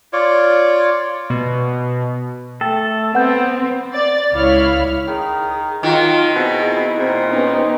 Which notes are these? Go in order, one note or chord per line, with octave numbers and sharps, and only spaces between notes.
F4 C#5 D5
B2
A3 A4 G5
B3 C4 F#5 G6
D5 A6
C#2 E4 C#5 F5 B5 F6
D#3 G#4
D#3 F#3 F4
B2 C4 E4 G#4
A#2 C4
B3 C#4 D#4